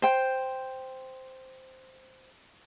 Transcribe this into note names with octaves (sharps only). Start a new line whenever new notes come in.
C5 G5